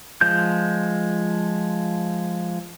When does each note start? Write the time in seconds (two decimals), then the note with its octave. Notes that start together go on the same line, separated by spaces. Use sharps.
0.21 F3 G#3 G6